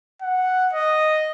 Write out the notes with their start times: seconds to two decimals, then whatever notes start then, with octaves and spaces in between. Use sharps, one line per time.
0.22 F#5
0.73 D#5